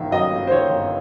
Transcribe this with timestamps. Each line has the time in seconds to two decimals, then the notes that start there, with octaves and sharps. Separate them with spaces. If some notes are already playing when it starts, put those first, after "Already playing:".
Already playing: G1 D#3 E5
0.11 F#2 D#5
0.31 G1
0.47 C5
0.51 D#3 C#5
0.70 G1